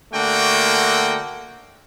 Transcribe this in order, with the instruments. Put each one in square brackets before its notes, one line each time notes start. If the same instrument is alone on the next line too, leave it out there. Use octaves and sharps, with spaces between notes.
[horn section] D3 A3 A#3 F#4 G5